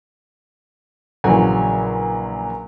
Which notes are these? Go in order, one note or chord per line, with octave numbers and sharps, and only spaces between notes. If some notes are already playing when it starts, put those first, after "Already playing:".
A#1 C#3 E3 F#3 G#5